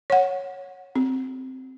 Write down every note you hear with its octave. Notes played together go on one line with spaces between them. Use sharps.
C#5 F#5
C4